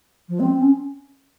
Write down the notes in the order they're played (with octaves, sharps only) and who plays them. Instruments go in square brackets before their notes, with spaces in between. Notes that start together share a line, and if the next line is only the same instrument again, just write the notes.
[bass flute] F3
C4
C4
C#4